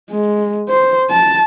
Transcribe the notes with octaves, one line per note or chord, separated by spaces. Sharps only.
G#3
C5
A5